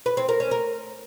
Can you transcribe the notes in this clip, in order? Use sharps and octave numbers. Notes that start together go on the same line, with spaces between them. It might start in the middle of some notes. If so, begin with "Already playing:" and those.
B4
C4
A#4
C#4
A#4